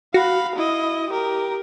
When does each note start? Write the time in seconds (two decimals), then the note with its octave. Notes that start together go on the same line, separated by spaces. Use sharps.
0.14 F#4 F5 B5
0.55 E4 D#5
1.10 G4 A#4